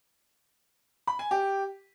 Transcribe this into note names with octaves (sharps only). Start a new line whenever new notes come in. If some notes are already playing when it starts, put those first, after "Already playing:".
B5
G#5
G4